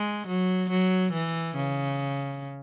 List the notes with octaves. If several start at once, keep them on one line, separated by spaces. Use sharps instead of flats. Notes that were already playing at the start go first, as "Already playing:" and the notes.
Already playing: G#3
F#3
F#3
E3
C#3